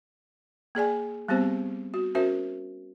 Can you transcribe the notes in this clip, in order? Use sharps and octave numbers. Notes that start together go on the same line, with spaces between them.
A#3 G#4 D5 G#5
G3 B3 C4 G4 C5
F#4
C#4 F#4 A#4 C5 E5